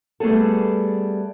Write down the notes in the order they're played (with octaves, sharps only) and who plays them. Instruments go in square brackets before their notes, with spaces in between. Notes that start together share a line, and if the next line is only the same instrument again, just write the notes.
[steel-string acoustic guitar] G3 A3 B3 G#4 A4